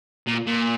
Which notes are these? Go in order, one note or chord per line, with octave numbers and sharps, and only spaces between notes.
A#2
A#2